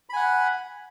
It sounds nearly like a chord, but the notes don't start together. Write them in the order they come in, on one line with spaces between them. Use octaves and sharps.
B5 G#5 F#5